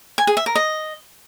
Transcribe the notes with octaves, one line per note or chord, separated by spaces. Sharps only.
G#5
G#4
E5
A#4
D#5